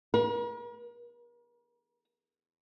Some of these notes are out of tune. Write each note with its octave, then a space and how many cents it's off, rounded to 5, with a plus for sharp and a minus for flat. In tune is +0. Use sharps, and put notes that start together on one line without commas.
A#4 +45